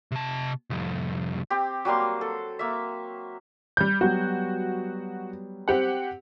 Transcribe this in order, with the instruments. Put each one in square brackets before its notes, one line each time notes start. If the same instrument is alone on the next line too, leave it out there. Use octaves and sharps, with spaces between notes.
[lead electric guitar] C3 A5
C2 F2
[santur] C4 G4
F#3 G3 A#3 C6
A4
A#3 E5
[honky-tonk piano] G3 G6
[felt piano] F#3 G3 B3 [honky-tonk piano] F#4
[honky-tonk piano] C4 G4 F#5